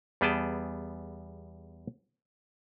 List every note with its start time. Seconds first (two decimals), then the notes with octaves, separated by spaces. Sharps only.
0.21 E2 G3 B3 G#4 G5 A5